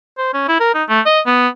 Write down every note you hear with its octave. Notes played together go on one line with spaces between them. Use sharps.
C5
C#4
E4
A#4
D#4
A3
D#5
B3